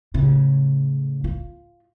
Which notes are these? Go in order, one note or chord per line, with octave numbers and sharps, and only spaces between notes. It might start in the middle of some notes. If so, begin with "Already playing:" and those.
A2 C#3
F4